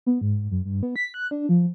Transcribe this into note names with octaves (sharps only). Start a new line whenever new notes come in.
B3
G#2
F#2
G2
B3
B6
F#6
D4
F3